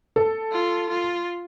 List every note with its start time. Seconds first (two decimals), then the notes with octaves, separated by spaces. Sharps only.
0.16 A4
0.52 F4
0.89 F4